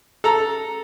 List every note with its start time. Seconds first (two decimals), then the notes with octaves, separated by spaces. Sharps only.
0.24 A4 A#5